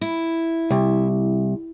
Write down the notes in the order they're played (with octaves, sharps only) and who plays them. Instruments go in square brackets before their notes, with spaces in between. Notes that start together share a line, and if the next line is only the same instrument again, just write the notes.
[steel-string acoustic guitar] E4
[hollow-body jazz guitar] C2